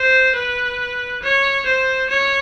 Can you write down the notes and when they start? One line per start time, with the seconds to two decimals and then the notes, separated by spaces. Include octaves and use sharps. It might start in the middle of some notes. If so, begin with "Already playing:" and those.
Already playing: C5
0.35 B4
1.23 C#5
1.66 C5
2.10 C#5